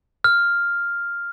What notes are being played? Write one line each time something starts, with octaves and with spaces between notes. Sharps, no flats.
F6